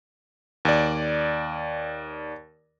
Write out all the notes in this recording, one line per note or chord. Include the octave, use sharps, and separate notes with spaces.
D#2 D5